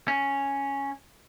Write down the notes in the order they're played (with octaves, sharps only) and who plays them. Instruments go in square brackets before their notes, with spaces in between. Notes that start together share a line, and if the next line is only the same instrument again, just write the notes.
[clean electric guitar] C#4